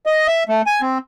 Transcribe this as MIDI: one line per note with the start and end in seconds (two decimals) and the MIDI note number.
0.06 0.27 75
0.27 0.43 76
0.49 0.62 57
0.66 0.81 80
0.81 0.98 60